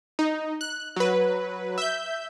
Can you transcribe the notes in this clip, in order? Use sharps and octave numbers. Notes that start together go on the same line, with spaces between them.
D#4
F#6
F#3 B4
E5 G6